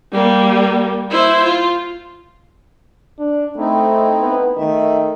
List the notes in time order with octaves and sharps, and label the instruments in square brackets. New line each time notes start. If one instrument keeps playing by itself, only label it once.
[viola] G3 A#3
E4 C5
F4
[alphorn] D4
[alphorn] A3 [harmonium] C4 D#4 E4
[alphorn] B3
[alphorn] D#3 [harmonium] A3 E5